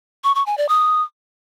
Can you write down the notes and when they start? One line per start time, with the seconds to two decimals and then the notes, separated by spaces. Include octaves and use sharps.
0.24 C#6
0.35 C#6
0.46 G#5
0.58 D5
0.69 D#6